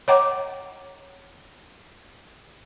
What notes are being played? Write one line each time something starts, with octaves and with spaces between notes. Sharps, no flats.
C#5 D#5 F#5 G5 A#5 D6